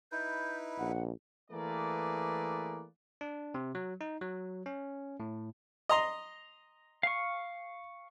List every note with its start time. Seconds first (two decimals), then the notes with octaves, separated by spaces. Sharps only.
0.12 D#4 E4 B4 G6
0.79 A#1 F#5
1.51 E3 A3 A#3 G#4 B4 D5
3.21 D4
3.54 C3
3.75 F#3
4.01 D#4
4.21 F#3
4.66 C#4
5.20 A2
5.89 D#5 A#5 C6
7.03 F5 C#6